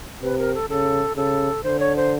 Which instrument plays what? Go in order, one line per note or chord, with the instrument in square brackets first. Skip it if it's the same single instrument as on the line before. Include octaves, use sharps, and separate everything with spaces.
[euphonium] C3 [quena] B4
[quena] A#4
A4
[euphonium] C#3 [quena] A4
[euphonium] C#3 [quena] A4
[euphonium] D3 [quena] C5
[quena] C#5
C5